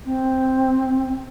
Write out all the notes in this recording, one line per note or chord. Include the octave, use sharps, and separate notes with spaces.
C4